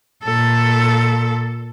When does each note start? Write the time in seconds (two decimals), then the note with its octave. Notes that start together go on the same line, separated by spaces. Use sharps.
0.24 A#2 A4